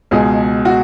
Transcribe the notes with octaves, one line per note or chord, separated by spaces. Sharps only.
C#2 B2 G#3 G#4
F#4